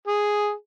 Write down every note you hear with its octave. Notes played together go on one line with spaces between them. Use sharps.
G#4